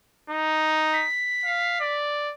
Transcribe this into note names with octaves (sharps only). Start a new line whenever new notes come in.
D#4
B6
F5
D5